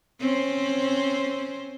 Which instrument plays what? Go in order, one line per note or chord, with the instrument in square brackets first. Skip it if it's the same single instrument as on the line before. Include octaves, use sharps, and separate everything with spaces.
[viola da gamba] C4 C#4 C5